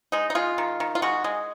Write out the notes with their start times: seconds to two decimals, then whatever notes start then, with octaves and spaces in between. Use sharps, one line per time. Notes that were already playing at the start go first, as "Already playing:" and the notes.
0.12 G#3 D#4
0.30 D#4
0.35 G#3 F4
0.58 D#3
0.80 D#3
0.95 F4
1.02 G#3 F#4
1.24 G#3